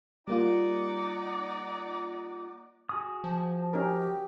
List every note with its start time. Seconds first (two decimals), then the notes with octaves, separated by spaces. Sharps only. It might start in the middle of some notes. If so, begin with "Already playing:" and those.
0.28 G3 A#3 D#4 F4 D5 F#5
2.89 F#4 G#4 D#6
3.24 F3 A5
3.73 C#4 D#4 G4 A#4